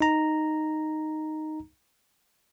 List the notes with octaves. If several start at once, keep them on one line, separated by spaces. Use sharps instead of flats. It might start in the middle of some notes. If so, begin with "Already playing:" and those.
D#4 A#5